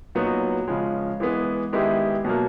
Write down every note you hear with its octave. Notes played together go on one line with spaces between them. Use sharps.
A#2 F#3 B3 D#4 F#4
C#3 F3 G#3
E3 G#3 B3
D#3 G#3 B3 E4 G4
B2 F#3 A#3